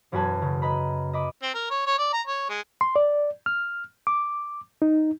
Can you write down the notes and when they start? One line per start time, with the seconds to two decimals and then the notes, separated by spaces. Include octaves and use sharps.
0.12 E1 F#2 F#4 B4 G#5 A5
0.42 C#3
0.62 B4 D#5 A#5 B5
1.13 D#5 B5 D6
1.43 C4
1.54 A#4
1.70 C#5
1.86 C#5
1.98 D5
2.13 A#5
2.27 C#5
2.49 G#3
2.81 C6
2.96 D5
3.46 F6
4.07 D6
4.82 D#4